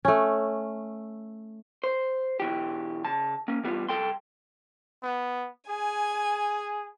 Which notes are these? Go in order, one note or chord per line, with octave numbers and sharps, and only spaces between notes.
A3 C#4
C5
B2 E3 G4
C#3 A5
A#3 C#4
E3 G3 B3 D#4 F4
C2 A#2 A4 G5 C6
B3
G#4 G#5